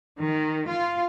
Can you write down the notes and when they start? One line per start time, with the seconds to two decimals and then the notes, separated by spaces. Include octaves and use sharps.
0.21 D#3
0.70 F4